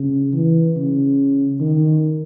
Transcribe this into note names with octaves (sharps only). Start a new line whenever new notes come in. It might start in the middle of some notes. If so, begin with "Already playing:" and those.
Already playing: C#3
E3
C#3
D#3